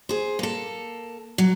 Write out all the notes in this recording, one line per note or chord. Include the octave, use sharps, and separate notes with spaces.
G#4 C5
A#3 A4
F#3